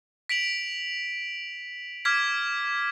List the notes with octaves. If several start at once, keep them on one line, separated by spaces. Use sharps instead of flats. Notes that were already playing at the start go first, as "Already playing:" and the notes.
B6 D7 F7 F#7
D6 F6 G#6 B6